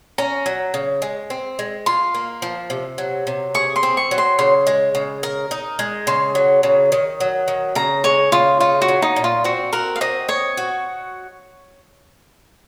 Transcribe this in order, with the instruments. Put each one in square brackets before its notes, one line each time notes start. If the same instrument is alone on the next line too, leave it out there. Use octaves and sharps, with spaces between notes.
[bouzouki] C#4 [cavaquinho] A#5
[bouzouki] F#3
C#3
G#3
C4
G#3
[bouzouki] F4 [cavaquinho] C6
[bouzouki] A#3
F3
C3
F#3
C3
[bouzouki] G#4 [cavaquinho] C#6
[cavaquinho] C6
[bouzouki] C4
[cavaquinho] C#6
[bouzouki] F#3
[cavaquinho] C6
[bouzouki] C#3 [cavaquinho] C6
[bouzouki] G#3
C#3
A#4
D#4
G#3
[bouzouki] C#3 [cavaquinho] C6
[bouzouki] F#3
C#3
D#3
F#3
D#3
[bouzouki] C#3 [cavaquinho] A#5
[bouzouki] G#3 [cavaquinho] C#5
[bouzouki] C#3 [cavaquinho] F4
[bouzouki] D#4 [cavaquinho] F4
[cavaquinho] F#4
[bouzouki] F#3
[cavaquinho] D#4
[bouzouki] A#2
[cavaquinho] F4
[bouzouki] C4 [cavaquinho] F#4
[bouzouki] F#4 [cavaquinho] A#4
[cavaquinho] F5
[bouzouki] C4 [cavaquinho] D#5
[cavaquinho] C#5 [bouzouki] D#5
[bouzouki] F#4